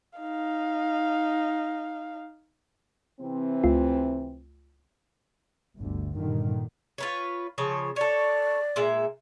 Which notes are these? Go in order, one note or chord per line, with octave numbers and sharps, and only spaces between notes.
D#4 F5
C3 E3 C4
C#2 A3 F4
G1 D2 D3
G2 A#2 D3 D#3
F4 B4 C#5
C#3 F3 C#5
A4 C#5 D5
A#2 G#3 E5